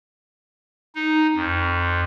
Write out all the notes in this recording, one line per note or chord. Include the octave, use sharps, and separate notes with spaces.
D#4
F2